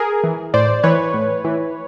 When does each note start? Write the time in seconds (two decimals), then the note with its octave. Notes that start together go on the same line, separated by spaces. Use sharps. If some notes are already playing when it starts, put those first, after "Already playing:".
Already playing: G#4 A#4
0.24 E3
0.54 A2 C5 D5
0.83 E3 B4 C#5
1.14 A2
1.44 E3